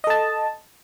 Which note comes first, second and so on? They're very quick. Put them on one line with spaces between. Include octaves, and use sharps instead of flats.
D#5 A4 A5